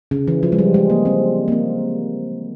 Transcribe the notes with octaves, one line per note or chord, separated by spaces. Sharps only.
C#3
E3
F3
G#3
G3
G#3
A#3
C4
A#3
C4